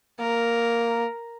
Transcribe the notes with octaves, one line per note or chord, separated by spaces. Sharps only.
A#3 A#4